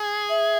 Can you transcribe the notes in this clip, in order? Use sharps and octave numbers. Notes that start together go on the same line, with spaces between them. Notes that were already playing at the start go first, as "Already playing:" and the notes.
Already playing: G#4
E5